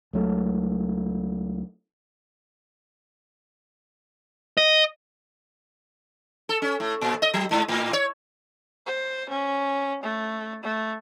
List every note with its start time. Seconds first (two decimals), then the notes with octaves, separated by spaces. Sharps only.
0.13 C#2 F#3 A3
4.57 D#5
6.49 A4
6.62 C#4
6.80 A2
7.01 A#2
7.22 D#5
7.34 F#3
7.51 G#2
7.68 A2
7.93 C#5
8.86 C5
9.29 C#4
10.03 A3
10.63 A3